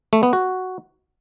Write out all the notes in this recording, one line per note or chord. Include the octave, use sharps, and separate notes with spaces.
A3
B3
F#4